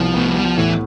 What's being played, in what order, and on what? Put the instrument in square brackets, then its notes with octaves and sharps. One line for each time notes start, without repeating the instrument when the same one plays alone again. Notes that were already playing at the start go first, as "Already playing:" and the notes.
Already playing: [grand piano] C2 B3 [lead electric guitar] F3
[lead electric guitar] A3 [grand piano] B3
[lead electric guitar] G3
[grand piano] B3
[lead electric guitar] F3
[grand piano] A2 [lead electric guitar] E3